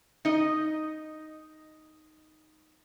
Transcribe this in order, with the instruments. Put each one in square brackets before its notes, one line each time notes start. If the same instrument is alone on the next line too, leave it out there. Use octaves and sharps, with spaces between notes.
[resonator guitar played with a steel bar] D#4 D#5